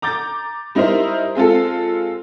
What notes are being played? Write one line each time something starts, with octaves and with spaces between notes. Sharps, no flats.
A#5 D6 G6 A6
G3 D#4 E4 A#4 C5 E5
G#3 C4 F4 A4